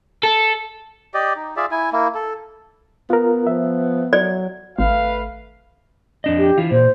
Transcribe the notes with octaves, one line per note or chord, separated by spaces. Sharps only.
A4
G4 D5 D#5
D#4
F4 G#4 D5 E5
E4 G#5
A#3 E4
A4
B3 F4 A#4
F3 E5
F#3 D5
G#1 A3 B4 F5
F2 D4 D#5
G4
E3 F4
A#2 C5